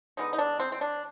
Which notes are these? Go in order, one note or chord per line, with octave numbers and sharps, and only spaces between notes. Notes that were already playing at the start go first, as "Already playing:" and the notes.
D3 G#3 B3 D#4
D#4
D4
C4
C4
D4